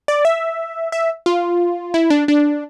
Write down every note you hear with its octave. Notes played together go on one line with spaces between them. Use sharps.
D5
E5
E5
F4
E4
D4
D4